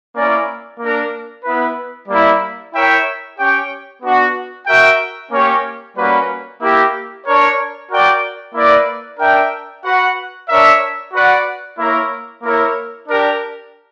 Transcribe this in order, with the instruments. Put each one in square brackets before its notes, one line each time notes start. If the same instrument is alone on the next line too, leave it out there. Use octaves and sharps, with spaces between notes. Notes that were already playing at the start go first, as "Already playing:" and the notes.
[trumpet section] A#3 C#4 E4 A#4 D5
A#3 D4 A#4
B3 E4 B4
G3 A#3 E4
E4 A#4 C#5 E5 G5
C#4 G4 C#5 G5
B3 D4 F#4
F#4 A#4 E5 G5
A#3 C#4 G4 C#5
G3 A#3 C#4 F#4 B4
A#3 E4 G4
D4 A#4 C#5
F#4 A#4 D5 G5
A#3 E4 B4 D5
D4 A#4 E5 G5
F#4 B4 F#5
D4 A#4 C#5 E5
F#4 B4 D5 F#5
A#3 E4 A#4 C#5
A#3 E4 A#4 C#5
D4 G4 A#4